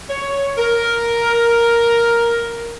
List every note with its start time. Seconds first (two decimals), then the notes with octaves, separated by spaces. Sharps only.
0.09 C#5
0.58 A#4